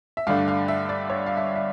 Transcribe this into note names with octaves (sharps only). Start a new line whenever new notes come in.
E5
G2 D3 A3 D4 F5
F5
E5
D5
C#5
F5
E5
E5